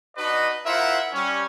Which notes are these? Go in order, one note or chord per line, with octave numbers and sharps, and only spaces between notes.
D4 D#4 F#4 B4 D#5
E4 F4 A#4 C5 E5 F#5
G3 C#4